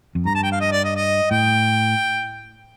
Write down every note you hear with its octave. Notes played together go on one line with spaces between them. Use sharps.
F2
G2 A#5
A5
G5
F5
D#5
D5
D#5
D#5
A2 G5